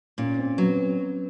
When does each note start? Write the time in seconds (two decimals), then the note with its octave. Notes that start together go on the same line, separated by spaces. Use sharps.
0.18 A#2 C#4
0.38 C4
0.58 F#3 B3